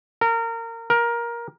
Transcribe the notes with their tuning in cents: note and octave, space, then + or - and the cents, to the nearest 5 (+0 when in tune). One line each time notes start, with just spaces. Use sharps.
A#4 -25
A#4 +15